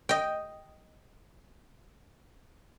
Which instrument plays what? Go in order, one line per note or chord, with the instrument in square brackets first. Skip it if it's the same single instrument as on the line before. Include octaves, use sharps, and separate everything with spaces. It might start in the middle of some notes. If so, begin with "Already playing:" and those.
[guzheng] D#5 G5